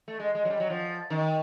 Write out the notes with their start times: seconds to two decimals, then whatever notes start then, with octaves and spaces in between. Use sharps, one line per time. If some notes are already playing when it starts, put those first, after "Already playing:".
0.08 A3
0.20 G#3
0.35 G#3
0.45 F#3
0.50 G3
0.60 F#3
0.70 F3
1.10 D#3